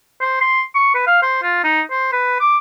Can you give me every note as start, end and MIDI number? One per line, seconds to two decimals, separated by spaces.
0.21 0.40 72
0.41 0.62 84
0.75 0.90 85
0.95 1.05 71
1.07 1.20 77
1.22 1.40 72
1.43 1.63 65
1.64 1.81 63
1.91 2.09 72
2.12 2.35 71
2.40 2.57 86